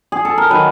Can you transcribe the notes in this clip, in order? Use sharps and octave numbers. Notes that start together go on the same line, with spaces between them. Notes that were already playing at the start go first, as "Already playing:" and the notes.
G#4
A4
A#4
D#3 F#3 B4